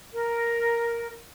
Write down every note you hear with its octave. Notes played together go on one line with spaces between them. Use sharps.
A#4